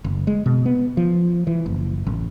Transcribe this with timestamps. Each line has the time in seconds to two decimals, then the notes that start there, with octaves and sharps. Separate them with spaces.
0.04 F#1
0.27 G#3
0.46 B2
0.66 B3
0.97 F3
1.47 E3
1.66 F#1
2.06 A1